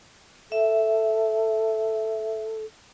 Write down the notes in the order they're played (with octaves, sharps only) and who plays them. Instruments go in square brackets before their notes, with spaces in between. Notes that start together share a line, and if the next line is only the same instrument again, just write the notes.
[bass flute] A4 [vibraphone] E5